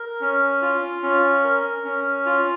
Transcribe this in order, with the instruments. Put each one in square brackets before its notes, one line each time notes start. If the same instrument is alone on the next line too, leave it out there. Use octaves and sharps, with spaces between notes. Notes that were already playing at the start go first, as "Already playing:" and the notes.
Already playing: [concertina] A#4
C#4
F4
C#4
A#4
C#4
F4